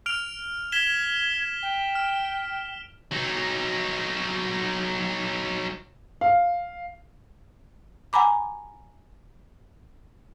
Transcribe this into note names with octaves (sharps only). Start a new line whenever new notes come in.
F6 D7 F7
G#6 B6 E7 G7
G5
F6
F#3 D#4
F5
F#5 G#5 A#5 B5 D6